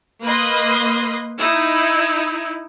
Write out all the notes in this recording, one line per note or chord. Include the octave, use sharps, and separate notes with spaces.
A#3 B4 D#5 C6
D#4 E4